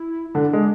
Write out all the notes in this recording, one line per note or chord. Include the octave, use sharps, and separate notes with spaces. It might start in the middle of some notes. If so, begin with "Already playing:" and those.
Already playing: E4
D3 D4
G#3